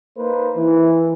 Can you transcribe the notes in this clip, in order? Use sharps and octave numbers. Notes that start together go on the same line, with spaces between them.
A#3 D#4 B4 C5
E3